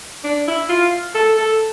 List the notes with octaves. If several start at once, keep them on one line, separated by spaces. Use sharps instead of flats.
D4
E4
F4
A4
A4